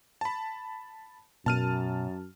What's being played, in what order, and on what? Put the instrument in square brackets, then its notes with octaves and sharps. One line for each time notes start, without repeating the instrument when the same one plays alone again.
[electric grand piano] A5 B5
[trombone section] F#2 [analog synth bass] B2 [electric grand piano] A5 F6 D#7